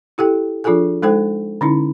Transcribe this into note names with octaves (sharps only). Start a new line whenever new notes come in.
E4 G4 A4 G5
F3 D4 F4 G#4 A4 G#5
G#3 D#4 A4 C5 G5
D3 C#4 D#4 E4